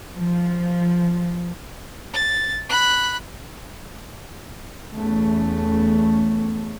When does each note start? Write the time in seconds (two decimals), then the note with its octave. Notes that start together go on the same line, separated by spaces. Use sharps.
0.15 F3
2.13 A6
2.69 B5 F#6
4.94 E2 A3 C#4